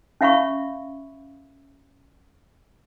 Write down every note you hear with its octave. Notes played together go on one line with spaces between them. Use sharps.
C#4 E5 F5 B5 C#6